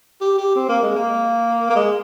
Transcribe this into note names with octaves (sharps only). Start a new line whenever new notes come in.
G4
G4
C4
A#3
G#3
A#3
A#3
G#3